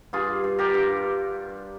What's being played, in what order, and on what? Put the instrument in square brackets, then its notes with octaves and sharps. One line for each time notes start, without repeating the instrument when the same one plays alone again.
[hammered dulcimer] G2 F4 G#4
G2
G4 A#4
G2